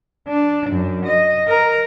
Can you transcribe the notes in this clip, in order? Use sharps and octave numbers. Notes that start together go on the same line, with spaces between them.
D4
F#2
D#5
A#4